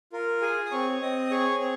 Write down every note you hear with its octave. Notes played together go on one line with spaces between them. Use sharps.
F4 A#4
G#4 G#5
D#6
C4 C#5 C#6
C4 D#5 D#6
G#4 C#5 C#6
C4 C#5 C#6